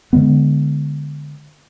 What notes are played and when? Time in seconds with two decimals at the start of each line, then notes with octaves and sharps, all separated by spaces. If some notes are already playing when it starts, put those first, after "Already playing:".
0.13 D3 F#3 G#3 B3